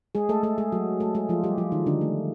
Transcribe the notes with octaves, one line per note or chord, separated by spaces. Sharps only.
G#3 G#4
A3 A4
A3 A4
G#3 G#4
F#3 F#4
A3 A4
G#3 G#4
F3 F4
G3 G4
F3 F4
D#3 D#4
D3 D4
A3